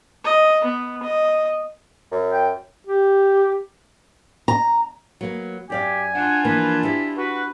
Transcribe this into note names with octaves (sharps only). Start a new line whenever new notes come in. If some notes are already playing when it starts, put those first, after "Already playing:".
D#5
B3
D#5
F#2
G5
G4
A#5
F#3 A#3 B3
F#2 G4 D5 F5 G#5
D4 F4 F#5
E3 F3 A#3 B4
B3 E4 G4
F#4 B4